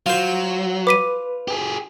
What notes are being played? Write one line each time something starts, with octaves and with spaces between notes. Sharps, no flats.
F#3 F4 C5
B4 D6 B6 D#7
G4 G#4